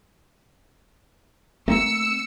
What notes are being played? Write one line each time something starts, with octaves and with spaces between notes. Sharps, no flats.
A3 A#3 C4 E6 C#7